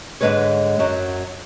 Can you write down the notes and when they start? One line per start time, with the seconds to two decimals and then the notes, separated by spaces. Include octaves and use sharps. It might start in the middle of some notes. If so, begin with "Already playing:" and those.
0.21 G#2 D3 F#3 G#3 B4 C#5
0.79 F#2 F#3